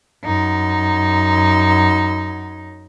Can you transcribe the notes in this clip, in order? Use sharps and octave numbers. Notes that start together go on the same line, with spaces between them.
F#2 D#4